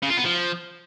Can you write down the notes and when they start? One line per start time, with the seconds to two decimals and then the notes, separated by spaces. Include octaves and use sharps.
0.03 C#3
0.10 F4
0.17 B3
0.25 F3